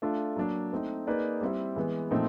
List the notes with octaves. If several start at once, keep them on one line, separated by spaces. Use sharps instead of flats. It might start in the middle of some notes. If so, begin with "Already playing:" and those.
A3 D4 F4
F#3 A#3 D4
A3 C4 D#4
A#3 D#4 G#4 B4 D5
G3 C4 E4
E3 G#3 B3
A#2 F3 A3 C4 D#4